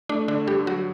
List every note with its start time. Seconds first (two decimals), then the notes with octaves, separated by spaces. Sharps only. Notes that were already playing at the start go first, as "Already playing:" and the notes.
0.09 A3 D4
0.28 D3 D4
0.47 G2 G4
0.66 F#3 F#4